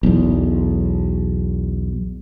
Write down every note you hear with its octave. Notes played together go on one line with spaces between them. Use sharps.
B1 E2